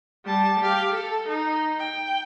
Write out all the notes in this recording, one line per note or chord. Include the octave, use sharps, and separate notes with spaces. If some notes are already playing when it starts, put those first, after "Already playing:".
G3 A5
G4 F5
A4
D#4
G5